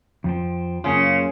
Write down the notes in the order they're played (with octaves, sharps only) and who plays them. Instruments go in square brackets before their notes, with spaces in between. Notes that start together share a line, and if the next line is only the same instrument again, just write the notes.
[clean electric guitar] F2 F3 C4
[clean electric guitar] F#2 A#3 F4 [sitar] C#3